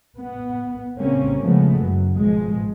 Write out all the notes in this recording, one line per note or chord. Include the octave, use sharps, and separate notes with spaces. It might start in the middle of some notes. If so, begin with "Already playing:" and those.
B3
C#3 G3 A#3 C4 C#4
C#3 F3 G#3 A3 B3
F#1 F#3
G#1 B2 F3 G#3